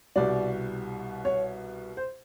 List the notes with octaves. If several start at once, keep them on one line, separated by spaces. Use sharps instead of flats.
C2 B2 G3 D5
C#5
C5